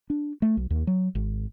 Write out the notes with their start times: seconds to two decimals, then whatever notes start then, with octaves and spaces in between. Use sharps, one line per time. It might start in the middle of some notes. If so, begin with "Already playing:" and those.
0.10 D4
0.42 A3
0.57 B1
0.70 D#2
0.87 F#3
1.15 G#1